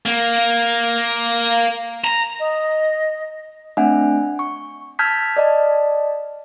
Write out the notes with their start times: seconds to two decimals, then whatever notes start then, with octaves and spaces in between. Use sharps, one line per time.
0.06 A#3
2.04 A#5
2.40 D#5
3.77 A3 C4 D4 E5 F#5 G#5
4.39 C#6
4.99 A5 E6 F6 G6 G#6 B6
5.37 D5 D#5 A5